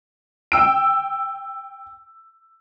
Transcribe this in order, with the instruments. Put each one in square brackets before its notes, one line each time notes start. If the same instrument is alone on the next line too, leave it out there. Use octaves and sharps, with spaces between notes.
[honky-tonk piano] G5 E6 D7